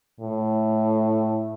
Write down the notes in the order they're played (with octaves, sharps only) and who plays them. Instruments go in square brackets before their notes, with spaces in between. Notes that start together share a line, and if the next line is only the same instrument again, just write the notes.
[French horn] A2